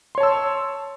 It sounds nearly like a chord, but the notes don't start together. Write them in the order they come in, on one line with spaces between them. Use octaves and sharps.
C6 C#5 A5 E6